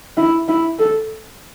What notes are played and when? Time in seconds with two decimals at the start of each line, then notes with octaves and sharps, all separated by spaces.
0.17 E4
0.48 E4
0.79 A4